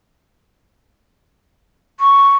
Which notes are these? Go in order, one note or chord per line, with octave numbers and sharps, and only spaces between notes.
C#6